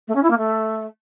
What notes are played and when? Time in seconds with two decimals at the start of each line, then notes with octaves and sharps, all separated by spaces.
0.08 A3
0.15 C#4
0.23 E4
0.30 A#3
0.38 A3